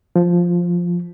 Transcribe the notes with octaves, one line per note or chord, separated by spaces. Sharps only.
F3